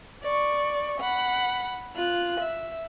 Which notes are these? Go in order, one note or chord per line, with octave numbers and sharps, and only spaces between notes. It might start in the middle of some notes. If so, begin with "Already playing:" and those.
D5 C#6
F#5 B5
F4 F#6
E5